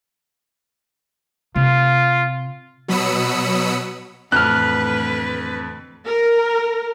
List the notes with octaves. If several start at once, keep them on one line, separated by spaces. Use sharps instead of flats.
C3 F4
B2 F#3 B5 D#6 E6 C#7
F2 A2 D3 E3 B4 F6 F#6
A#4